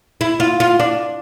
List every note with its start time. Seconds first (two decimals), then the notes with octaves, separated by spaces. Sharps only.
0.21 E4
0.40 F4
0.60 F4
0.80 D4